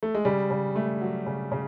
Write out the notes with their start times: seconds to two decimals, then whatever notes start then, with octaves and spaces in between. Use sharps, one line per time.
0.03 A3
0.15 G#3
0.25 C#3 G3
0.50 C#3
0.76 A3
1.01 F#3
1.27 C#3
1.52 C#3